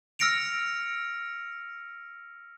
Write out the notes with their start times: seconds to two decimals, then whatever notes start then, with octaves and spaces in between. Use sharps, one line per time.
0.19 E6 F6 A#6 C#7 D7 F7